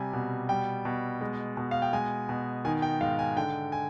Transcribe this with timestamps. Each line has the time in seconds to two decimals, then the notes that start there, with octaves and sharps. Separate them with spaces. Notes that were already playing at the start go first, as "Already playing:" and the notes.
Already playing: C3 G3 G#5
0.13 B2
0.49 G3 G5
0.85 B2
1.21 G#3
1.57 B2
1.71 F5
1.82 G5
1.93 G#3 G#5
2.29 B2
2.65 D#3 G#5
2.82 G5
3.01 G#2 F5
3.19 G#5
3.37 D3 G5
3.72 G#5